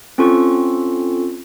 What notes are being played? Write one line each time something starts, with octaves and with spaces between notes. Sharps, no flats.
C4 C#4 F4 A4 C#6